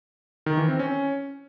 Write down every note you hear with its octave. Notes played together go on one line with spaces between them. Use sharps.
D#3
E3
C4
C#4